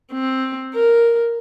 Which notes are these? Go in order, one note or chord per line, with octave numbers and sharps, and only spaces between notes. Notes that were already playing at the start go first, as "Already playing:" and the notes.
C4
A#4